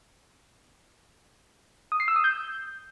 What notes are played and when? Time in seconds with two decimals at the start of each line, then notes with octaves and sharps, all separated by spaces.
1.92 D#6
2.00 C7
2.08 E6
2.16 D#6
2.24 G6